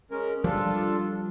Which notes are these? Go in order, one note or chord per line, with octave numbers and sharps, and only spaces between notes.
G#3 C#4 A#4
F3 G3 D4 F4 A4